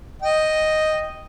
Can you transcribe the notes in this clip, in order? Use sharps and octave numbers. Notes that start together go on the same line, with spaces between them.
D#5 G5